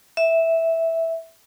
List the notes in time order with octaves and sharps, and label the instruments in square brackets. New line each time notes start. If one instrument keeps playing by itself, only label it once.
[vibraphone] E5